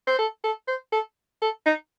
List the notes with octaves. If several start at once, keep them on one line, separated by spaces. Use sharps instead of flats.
C5
A4
A4
C5
A4
A4
D#4